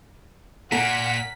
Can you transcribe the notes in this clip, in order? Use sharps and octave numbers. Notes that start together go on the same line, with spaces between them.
A#2 A#4 F#5 G#5 A#5 B6